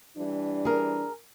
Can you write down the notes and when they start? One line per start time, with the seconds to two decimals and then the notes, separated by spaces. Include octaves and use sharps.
0.17 E3 G3 D4
0.65 G#4 A#4